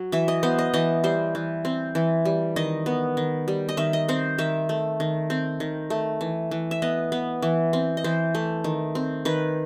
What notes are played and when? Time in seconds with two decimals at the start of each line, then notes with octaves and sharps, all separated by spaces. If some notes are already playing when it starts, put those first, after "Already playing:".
Already playing: F#3
0.12 E3 E5
0.28 D#5
0.43 B3 C5
0.59 D#5
0.74 E3 D#5
1.04 G3 C5
1.35 E3
1.65 C4
1.95 E3
2.25 G3
2.56 D#3 D#5
2.86 B3
3.17 D#3
3.48 G3
3.69 D#5
3.77 D#3 E5
3.93 D#5
4.08 C4 C5
4.38 D#3 E5
4.69 A3
5.00 D#3
5.30 C4
5.60 D#3
5.90 A3
6.21 E3
6.51 E3
6.71 E5
6.82 B3 D#5
7.12 B3
7.42 E3
7.73 C4
7.97 D#5
8.04 E3 C5
8.35 A3
8.64 D#3
8.95 C4
9.25 D#3 B4